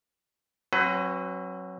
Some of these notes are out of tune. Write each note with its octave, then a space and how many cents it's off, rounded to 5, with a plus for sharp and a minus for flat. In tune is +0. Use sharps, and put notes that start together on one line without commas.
F#3 +0 C4 +45 B4 +30